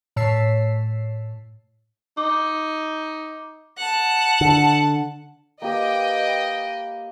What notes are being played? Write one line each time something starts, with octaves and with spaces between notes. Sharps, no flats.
A2 C#5 A5 E6 B6 C7
D#4 D6
F#5 A5
D3
A#3 G4 B4 D#5 G5